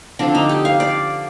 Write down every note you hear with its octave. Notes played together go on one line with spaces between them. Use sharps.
D3 F3 C4 D4
D#4
G4
F5
D5